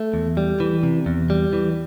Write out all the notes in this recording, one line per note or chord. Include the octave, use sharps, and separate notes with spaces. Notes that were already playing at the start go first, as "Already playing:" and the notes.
Already playing: A3
E2
G3
E3
C3
E2
G3
E3